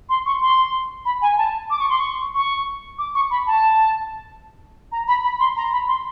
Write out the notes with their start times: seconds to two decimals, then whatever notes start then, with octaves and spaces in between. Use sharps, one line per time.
0.09 C6
0.26 C#6
0.42 C6
1.05 B5
1.22 G#5
1.38 A5
1.70 D6
1.79 C#6
1.89 C6
1.99 C#6
2.34 C#6
2.98 D6
3.15 C#6
3.31 B5
3.47 A5
4.92 A#5
5.08 B5
5.23 B5
5.40 C6
5.56 A#5
5.72 B5
5.88 C6